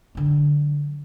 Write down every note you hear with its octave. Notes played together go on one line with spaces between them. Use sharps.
D3 F#3